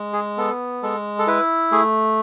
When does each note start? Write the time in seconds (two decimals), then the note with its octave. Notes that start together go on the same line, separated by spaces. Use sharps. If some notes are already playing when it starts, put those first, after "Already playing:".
Already playing: G#3
0.13 G#4
0.38 B3 A4
0.83 G#3 A4
1.19 A4
1.27 E4 B4
1.72 A3 G#4